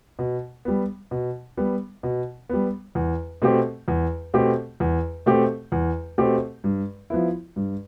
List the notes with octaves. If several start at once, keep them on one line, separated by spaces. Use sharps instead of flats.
B2
G3 B3
B2
G3 B3
B2
G3 B3
E2
B2 A3 C4 G4
E2
B2 A3 C4 G4
E2
B2 A3 C4 G4
E2
B2 A3 C4 G4
G2
F3 B3 E4
G2